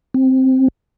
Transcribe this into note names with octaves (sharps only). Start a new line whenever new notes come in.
C4